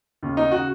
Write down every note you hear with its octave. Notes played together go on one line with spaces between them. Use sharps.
D#2 C#3
D#4
C#3 F#4